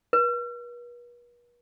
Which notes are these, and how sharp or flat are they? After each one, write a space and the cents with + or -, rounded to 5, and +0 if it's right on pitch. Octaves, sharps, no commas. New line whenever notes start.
B4 -45